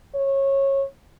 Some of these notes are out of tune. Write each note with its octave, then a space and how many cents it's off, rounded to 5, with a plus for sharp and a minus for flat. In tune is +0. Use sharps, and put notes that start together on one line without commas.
C#5 -20